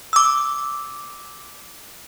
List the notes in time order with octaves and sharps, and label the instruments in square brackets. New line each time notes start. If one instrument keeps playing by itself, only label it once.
[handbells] D6 E6